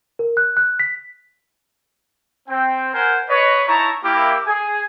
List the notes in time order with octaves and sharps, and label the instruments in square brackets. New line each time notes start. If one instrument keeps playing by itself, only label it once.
[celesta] A#4
F#6
F#6
B6
[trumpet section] C4 G5
A#4 C5 F#5 G#5
B4 C#5 D#5
D#4 E4 C#5 A5 A#5 C#6
A#3 E4 G4
G#4 G#5